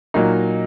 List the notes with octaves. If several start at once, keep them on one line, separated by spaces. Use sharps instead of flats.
A#2 F#3 A#3 D#4